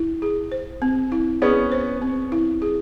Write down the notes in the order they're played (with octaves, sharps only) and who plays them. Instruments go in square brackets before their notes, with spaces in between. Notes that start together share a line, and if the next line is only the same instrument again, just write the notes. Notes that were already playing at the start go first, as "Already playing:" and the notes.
Already playing: [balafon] E4
G#4
C5
C4
E4
[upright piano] B3 C#4 [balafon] G#4
[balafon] C5
C4
E4
G#4